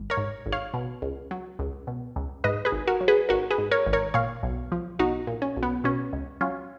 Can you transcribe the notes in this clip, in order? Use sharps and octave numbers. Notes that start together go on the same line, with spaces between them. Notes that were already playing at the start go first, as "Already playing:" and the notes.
Already playing: G#1
A#4 C#5
G#2
G#1
C#5 F5
B2
C#2
F#3
C#2
B2
C#2
G#2 B4 D#5
G#4 B4
G#1
F#4 A#4
F#3
G#4 B4
G#1 F#4 A#4
G#4 B4
G#2
A#4 C#5
G#1
A#4 C#5
A#2 C#5 F5
B1
F3
B1 D#4 F#4
A#2
C#4
B1
B3
B2 C#4
C#2
F#3 C#4 F4